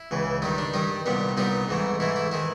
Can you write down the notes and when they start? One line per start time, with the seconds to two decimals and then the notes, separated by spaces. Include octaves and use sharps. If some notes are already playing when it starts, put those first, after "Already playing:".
Already playing: E4
0.11 C#2 C#3 E3
0.42 G2 D#3 G3 D#4
0.58 D4
0.74 G2 D#3 G3 D#4
1.06 C2 A#2 G3 B3
1.37 C2 A#2 G3 B3 D#4
1.68 G#2 E3 A3
2.00 G#2 E3 A3 E4
2.16 E4
2.32 D#3 G#3 E4